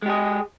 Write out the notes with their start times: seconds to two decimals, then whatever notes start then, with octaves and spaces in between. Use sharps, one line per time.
0.02 G#3
0.06 G4
0.09 G#4